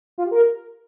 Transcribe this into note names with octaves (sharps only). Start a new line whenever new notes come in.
F4
G4
A#4